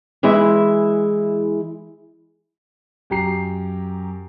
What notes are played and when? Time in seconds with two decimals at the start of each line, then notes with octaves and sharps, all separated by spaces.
0.23 E3 G#3 E4 E5
3.10 F#2 G4 A#5 C7